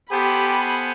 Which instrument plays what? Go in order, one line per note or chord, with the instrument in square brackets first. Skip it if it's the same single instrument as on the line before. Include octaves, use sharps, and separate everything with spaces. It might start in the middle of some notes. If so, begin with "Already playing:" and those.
[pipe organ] B3 [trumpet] G4 [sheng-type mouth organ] A4 C5 G#5 [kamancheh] B5